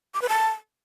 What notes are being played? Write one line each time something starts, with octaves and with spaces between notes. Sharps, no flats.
D6
B4
A5